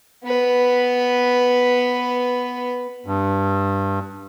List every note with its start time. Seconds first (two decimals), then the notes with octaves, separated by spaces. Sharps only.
0.24 B3 B4
3.06 G2